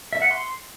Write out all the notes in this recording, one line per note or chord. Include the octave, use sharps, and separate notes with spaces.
E5
F#5
C6